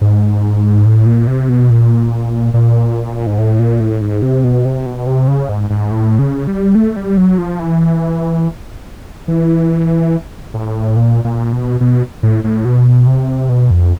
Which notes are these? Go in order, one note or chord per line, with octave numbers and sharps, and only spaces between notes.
G#2
A2
A#2
C3
B2
A#2
A#2
G#2
A2
A#2
A2
G#2
C3
B2
C3
B2
C3
C#3
G#2
G#2
A2
C#3
G3
A3
G3
F#3
F3
E3
E3
A2
A#2
A#2
B2
B2
A2
A2
B2
C3
B2
F2